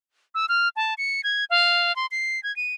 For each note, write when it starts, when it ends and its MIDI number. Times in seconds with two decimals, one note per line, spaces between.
0.35 0.46 88
0.49 0.69 89
0.76 0.94 81
0.98 1.21 97
1.24 1.45 92
1.50 1.95 77
1.96 2.06 84
2.11 2.43 96
2.43 2.54 92
2.56 2.75 99